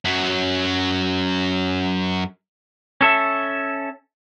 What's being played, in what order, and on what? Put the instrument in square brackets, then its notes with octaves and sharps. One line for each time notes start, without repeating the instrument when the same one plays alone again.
[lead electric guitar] F#2 F#3
[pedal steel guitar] C#4 A4 E5